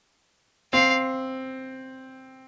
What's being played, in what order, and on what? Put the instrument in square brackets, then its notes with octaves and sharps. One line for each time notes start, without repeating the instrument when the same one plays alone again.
[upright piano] C4 [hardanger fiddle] F5